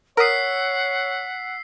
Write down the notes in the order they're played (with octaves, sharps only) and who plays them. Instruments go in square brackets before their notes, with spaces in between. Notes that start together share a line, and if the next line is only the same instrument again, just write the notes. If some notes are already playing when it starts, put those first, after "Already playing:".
[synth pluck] A#4 D#6 [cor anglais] C#5 [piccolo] F#5 [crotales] E6 B6 C7